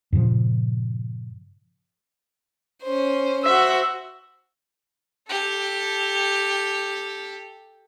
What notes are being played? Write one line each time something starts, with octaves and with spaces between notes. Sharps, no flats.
G2 A#2 C#3 F3
C#4 C5
F#4 C5 E5
G4 A4